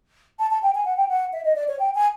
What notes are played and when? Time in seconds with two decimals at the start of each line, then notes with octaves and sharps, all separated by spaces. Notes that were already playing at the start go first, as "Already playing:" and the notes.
0.39 A5
0.51 A5
0.63 G5
0.75 G#5
0.85 F#5
0.97 G5
1.09 F#5
1.33 E5
1.45 D#5
1.56 D5
1.68 C#5
1.79 G5
1.95 G#5